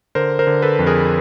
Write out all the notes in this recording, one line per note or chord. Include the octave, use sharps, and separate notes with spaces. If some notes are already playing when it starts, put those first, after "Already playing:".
D3 A#4 C5
A#4 C5
D3
A4 B4
F2
G#4 A#4